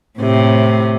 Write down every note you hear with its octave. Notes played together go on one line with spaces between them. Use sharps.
A2 C3